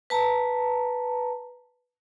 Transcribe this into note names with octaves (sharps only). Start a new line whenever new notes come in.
B4 A5 A#5